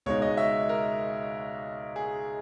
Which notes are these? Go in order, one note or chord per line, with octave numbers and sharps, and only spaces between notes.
C#2 B2 G#3 D#4 C#5
D#5
E5
A#4
G#4